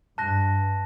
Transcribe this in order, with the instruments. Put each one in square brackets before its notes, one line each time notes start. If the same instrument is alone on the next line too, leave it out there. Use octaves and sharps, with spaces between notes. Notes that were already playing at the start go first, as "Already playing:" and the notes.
[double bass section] G2 [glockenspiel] A5 F#6 A#6